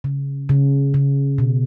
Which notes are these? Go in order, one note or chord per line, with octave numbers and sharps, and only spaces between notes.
C#3
C#3
C#3
B2